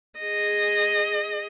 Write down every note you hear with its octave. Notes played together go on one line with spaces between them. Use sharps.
G#4 D#5